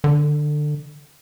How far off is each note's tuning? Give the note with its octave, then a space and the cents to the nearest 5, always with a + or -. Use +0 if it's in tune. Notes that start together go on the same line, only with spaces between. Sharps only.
D3 +20